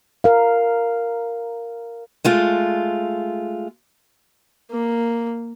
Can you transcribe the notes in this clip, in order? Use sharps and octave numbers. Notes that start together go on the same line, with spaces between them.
A#4 F5
G#3 A3 F4
A#3